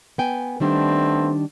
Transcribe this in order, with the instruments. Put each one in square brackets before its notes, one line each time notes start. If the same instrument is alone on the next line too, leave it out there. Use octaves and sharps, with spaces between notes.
[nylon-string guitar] B3 G5 G#5
[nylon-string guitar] D#3 G3 D4 [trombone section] A3 B3 C4